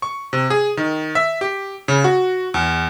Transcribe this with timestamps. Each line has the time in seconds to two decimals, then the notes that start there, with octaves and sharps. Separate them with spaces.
0.02 C#6
0.33 C3
0.50 G#4
0.77 D#3
1.15 E5
1.41 G4
1.88 C#3
2.04 F#4
2.54 E2